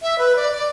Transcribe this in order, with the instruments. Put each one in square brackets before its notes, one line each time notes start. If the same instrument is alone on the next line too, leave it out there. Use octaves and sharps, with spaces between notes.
[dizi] E5
B4
D5
D5